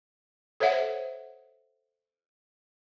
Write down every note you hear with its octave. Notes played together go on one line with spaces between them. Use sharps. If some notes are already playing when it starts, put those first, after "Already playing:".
A4 C5 C#5 E5 F#5